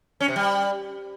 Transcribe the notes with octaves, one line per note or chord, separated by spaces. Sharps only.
C#4
C3
G3